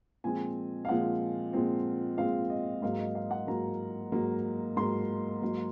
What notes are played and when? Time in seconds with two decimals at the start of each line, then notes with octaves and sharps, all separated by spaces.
0.24 A#2 F3 G#3 C4 G#5
0.85 F5
0.88 A#2 F3 G#3 C4 F#5
1.53 A#2 F3 G#3 C4
2.18 A#2 F3 G#3 C4 F5
2.50 D#5
2.82 G#2 F#3 A#3 F5
2.99 D#5
3.15 F5
3.31 F#5
3.47 G#2 F#3 A#3 A#5
4.12 G#2 F#3 A#3
4.77 G#2 F#3 A#3 C6
5.42 G#2 F#3 A#3